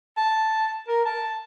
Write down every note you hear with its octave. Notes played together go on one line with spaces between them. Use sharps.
A5
A#4
A5